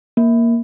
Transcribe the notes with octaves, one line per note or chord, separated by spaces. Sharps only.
A#3